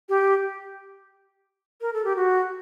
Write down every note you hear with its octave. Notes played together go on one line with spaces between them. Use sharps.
G4
A#4
A4
G4
F#4